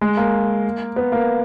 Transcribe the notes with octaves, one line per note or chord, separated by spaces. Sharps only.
G#3
A#3
B3
A#3